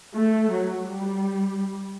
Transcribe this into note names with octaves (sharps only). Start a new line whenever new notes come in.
A3
F#3
G3